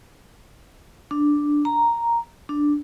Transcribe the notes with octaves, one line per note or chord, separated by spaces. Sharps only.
D4
A#5
D4